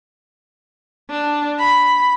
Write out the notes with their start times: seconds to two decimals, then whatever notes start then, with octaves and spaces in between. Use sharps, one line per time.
1.10 D4
1.59 B5